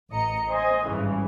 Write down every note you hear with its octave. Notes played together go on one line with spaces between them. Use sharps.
A1 D#5 A#5 C#7
C5 D#5 G#5 D#6
G#1 G2 C#3 E3